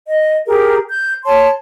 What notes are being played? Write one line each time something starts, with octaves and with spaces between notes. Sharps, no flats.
D#5
G4 G#4 A#4
G6
C#5 A5 C6